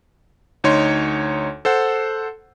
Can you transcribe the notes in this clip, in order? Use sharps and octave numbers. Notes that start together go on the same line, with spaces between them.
D2 D#4 C#5 C6
A4 C5 F#5